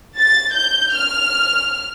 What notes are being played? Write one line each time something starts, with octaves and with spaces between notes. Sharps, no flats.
A6
G6
F6